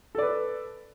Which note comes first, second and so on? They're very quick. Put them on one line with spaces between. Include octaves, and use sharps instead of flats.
A4 D5 B4